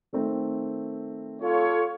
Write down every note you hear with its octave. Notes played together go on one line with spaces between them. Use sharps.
D#3 A3 C4
F4 A4 C#5